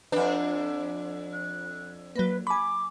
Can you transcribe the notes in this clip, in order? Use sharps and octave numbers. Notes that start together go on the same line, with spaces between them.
F2 D4 B4
F#6
F#3 A#3 B4
G#5 B5 D6